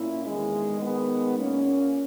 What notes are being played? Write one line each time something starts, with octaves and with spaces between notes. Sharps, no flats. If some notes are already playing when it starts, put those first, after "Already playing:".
Already playing: A#2 A#3 C#4 E4
E2 D#3 G#3
D#3 G#3 B3
A#2 A#3 C#4